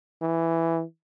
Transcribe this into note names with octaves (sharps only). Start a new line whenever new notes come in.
E3